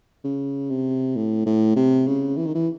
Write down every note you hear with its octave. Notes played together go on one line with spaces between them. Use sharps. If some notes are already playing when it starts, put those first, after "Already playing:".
C#3
C3
A2
A2
C3
C#3
E3
D#3
E3